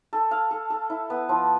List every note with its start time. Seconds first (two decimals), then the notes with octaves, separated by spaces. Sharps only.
0.13 A4
0.31 F5
0.51 A4
0.70 A4
0.90 E4
1.10 B3
1.29 F3